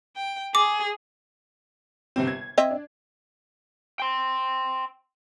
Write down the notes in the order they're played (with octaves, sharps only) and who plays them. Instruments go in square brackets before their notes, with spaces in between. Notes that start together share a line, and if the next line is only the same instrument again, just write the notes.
[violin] G5
[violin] G#4 [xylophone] D6
[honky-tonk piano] G1 C3 C4
G#6
[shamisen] C4 D#5 E5
[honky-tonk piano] D4
[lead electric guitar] G5 C6